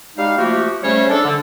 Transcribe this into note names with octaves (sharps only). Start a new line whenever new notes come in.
G3 G#3 D#4 F5
F3 A3 A#3 F#4 G4
C#3 G3 A3 C#4 C5 C#5
D4 A4
D3